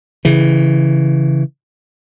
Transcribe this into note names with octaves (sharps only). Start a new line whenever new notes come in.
C#3 E3